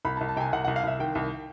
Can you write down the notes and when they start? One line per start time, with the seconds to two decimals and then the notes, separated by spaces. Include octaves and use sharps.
0.05 C2 B5
0.17 A5
0.21 C2
0.29 A5
0.36 C3 G5
0.40 G#5
0.53 C2 F#5
0.65 C2 F#5
0.76 F5
0.83 C2 E5
0.99 D#3 G5
1.15 C2